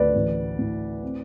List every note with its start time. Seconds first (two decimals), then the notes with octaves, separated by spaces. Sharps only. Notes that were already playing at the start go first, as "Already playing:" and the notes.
Already playing: D2 B4 D5
0.15 A1
0.58 A2
1.03 C4